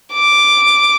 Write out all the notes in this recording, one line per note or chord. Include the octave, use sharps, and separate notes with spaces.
D6